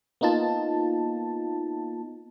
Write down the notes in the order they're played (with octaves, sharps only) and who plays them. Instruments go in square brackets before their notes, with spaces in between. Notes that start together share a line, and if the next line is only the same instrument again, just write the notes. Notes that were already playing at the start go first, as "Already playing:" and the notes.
[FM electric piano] A#3 B3 D#4 F4 A5